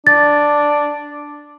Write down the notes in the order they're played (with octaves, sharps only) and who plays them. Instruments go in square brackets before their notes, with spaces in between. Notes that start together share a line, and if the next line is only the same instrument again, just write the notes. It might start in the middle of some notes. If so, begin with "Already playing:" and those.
[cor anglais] D4 [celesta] A6